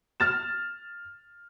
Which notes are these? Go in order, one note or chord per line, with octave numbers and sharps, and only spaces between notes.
F6 A6 E7